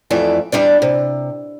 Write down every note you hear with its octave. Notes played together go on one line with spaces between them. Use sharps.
F2 E3 A3 D5
E2 G3 D4 D5
C3